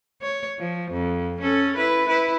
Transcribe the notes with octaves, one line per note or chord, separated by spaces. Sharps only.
C#5
F3
F2
C#4 A4
E4 B4
E4 B4